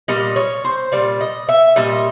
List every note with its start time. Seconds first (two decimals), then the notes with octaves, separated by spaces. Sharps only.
0.08 A#2 G3 D#5
0.36 C#5
0.64 C5
0.92 A#2 G3 D5
1.20 D#5
1.49 E5
1.76 A#2 G3 D#5